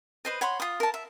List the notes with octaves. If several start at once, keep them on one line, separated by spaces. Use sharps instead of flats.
B4 C5 D#5
C#5 F#5 B5 C6
F4 D#6
A#4 A5
E5